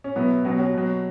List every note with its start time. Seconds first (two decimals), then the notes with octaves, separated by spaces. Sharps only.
0.04 C#4
0.16 B2 F#3 B3 E4
0.45 B2 F#3 C#4 F#4
0.59 C#4 F#4
0.74 B2 F#3